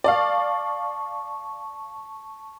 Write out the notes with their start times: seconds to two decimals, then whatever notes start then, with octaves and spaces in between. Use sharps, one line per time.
0.04 D5 F5 A5 C#6